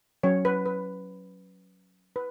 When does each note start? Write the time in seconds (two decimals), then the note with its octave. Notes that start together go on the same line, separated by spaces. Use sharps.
0.23 F#3 C#4 C#5
0.45 B4
0.66 B4
2.16 B4